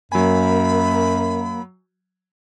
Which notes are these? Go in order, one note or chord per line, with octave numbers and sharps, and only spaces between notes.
F#2 F#3 A#3 G#5 B5